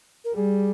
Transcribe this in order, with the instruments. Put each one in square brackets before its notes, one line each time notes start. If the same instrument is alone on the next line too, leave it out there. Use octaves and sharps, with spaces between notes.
[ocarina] A#4
[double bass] G3 [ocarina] G#4